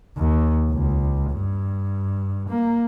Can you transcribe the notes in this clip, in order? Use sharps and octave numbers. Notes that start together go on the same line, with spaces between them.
D#2
C#2
G2
A#3